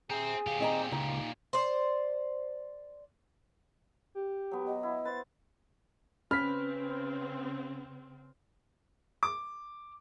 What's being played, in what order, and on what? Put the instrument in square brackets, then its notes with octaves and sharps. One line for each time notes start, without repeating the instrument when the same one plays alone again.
[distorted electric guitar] C4 [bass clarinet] G#4 [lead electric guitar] E5 A#5
[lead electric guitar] D2 F5 [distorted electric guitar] A#2 G4
[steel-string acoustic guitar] D#3 D#5 A#5 [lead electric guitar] C4
[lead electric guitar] C#2 [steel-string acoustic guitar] D#4
[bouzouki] C5 D5
[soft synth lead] G4
[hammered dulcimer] F#3 B3
[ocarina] D#5
[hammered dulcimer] E4
[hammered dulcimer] B4 C5 [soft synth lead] A6
[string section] C#3 C4 [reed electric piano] C#4 [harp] B4 [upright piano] F6 B6
[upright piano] D6